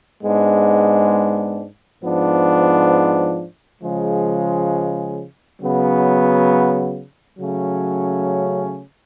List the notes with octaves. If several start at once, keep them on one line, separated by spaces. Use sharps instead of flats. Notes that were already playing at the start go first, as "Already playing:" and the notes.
G#2 G#3 B3 D4
G#2 F3 B3 D4
C#3 F3 G#3
C#3 F#3 B3
C#3 F#3 A3 C#4